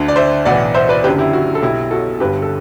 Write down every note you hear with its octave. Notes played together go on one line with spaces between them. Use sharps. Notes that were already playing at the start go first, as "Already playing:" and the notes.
Already playing: D2 D3
D5
C5 E5
B1 A2 E3 D5 F#5
C5 E5
B4 D5
F#1 F#2 D3 G4 B4
E4 G4
F#4
A4
B1 B2 E4 G4
F#4 A4
G1 G2 D3 G4 B4
A4